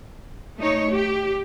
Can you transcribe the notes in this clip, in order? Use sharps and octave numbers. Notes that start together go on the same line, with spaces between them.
A3 D#4 C#5
G4